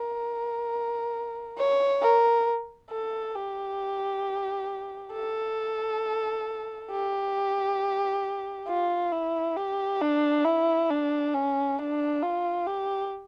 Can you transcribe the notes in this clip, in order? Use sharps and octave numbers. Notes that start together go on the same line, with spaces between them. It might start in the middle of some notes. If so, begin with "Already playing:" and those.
Already playing: A#4
C#5
A#4
A4
G4
A4
G4
F4
E4
G4
D4
E4
D4
C#4
D4
F4
G4